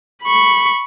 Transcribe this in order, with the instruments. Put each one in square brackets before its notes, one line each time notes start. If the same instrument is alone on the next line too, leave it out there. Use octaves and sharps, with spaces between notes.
[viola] B5 C#6